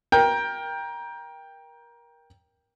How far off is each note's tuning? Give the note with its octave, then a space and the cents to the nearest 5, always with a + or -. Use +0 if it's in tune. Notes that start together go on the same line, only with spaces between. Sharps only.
A#4 +20 G5 +10